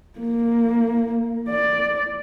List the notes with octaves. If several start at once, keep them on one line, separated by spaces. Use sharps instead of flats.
A#3
D5